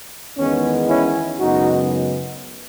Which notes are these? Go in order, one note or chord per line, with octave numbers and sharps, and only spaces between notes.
E2 D#3 G#3 B3 C#4
C#4 E4
F#2 C#3 G#3 B3 D#4 F#4